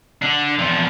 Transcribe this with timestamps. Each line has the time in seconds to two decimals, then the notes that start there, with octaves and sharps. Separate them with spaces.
0.22 D3 D4
0.58 E2 F3